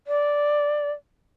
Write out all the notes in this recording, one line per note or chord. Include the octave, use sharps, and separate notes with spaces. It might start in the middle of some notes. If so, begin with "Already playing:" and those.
D5